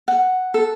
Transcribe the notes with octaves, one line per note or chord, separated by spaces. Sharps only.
F#5
A4